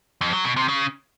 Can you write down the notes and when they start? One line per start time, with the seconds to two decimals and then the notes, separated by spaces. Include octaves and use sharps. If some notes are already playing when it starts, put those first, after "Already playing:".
0.21 F2
0.33 F#3
0.45 B2
0.57 C3
0.68 C#3